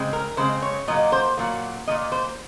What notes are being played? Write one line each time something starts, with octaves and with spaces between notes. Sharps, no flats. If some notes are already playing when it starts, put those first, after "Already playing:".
Already playing: C#3 G#3 C4
A#4
C#3 G#3 C4 C5
C#5
A#2 F#3 A#3 D#5
C5
A#2 F#3 A#3
A#2 F#3 A#3 D#5
C5